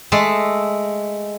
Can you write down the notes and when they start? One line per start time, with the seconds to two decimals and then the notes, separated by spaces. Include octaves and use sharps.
0.12 G#3 A3 A4 E5